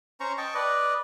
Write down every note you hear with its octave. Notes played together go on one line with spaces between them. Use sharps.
C#4 C5 A#5 C#6
D#5 G5 A5 C#6
B4 D5 D#5